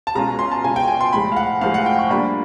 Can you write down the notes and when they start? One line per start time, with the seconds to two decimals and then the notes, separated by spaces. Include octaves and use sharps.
0.07 A5
0.15 B2 G#3 C#4 F4 A#5
0.39 C6
0.51 A5
0.64 B2 G#3 C#4 F4 G#5
0.76 G5
0.88 G#5
1.01 C6
1.13 A2 F3 G#3 B5
1.32 F5
1.36 F#5
1.61 A2 F3 G#3 F5
1.74 F#5
1.86 G5
1.99 C#6
2.10 G3 A#3 D4 F4 B5